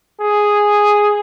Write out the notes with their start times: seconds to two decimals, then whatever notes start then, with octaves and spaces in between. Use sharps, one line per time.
0.21 G#4